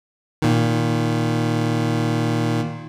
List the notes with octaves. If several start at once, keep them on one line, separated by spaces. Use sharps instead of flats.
A#2 D#3